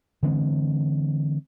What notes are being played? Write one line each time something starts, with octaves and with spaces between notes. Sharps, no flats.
D3 E3 G#3 C4